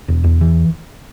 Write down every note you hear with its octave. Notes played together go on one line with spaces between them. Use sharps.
E1
E2
E3